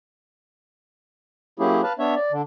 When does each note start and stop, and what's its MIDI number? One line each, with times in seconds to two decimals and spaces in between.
1.60 1.81 54
1.60 1.81 58
1.60 1.81 61
1.60 1.81 64
1.60 1.81 67
1.60 1.81 68
1.83 1.93 71
1.83 1.93 77
1.83 1.93 81
1.99 2.15 59
1.99 2.15 62
1.99 2.15 73
1.99 2.15 76
2.16 2.32 74
2.32 2.42 50